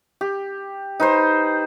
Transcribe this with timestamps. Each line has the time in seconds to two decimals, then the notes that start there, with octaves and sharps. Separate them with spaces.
0.21 G4
1.00 D#4 B4 C5